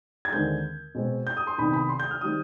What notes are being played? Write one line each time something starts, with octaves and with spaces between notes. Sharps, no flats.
G#6
D#2 D3 G#3 C4 G6
B2 G#3 C4
G6
D#6
C6
C2 C3 D#3 B3 B5
B5
C6
G6
F6
D#3 G3 C4 D#6